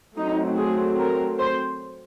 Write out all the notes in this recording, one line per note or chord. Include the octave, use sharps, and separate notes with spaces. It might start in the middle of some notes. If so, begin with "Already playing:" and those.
F#3 A3 C4 D#4
G#4
A#4
C5